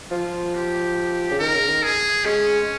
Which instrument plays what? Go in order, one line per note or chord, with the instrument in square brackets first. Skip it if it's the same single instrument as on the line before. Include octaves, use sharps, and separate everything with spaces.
[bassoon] F3 [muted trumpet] F4
[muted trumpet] G4
[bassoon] C#3
[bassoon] D#3 [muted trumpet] A#4
[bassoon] C#3
D#3
[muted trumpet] G#4
[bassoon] G#3 [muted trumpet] C#4